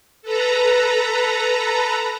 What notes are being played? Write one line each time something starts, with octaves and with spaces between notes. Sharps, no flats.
A4 B4 A#5